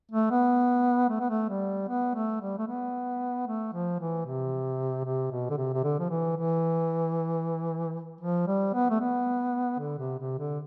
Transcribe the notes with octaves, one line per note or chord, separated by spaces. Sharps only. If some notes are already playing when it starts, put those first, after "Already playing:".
A3
B3
A3
B3
A3
G3
B3
A3
G3
A3
B3
A3
F3
E3
C3
C3
B2
D3
C3
C3
D3
F3
E3
E3
F3
G3
B3
A3
B3
D3
C3
C3
D3